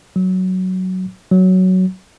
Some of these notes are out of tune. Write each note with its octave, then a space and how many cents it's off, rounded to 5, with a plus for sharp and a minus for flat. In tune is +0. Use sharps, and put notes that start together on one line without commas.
F#3 +5
F#3 +5